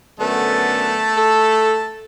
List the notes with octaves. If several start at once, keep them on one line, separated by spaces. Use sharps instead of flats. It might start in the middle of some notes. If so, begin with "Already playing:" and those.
F#2 D3 A3 B3 A5
A4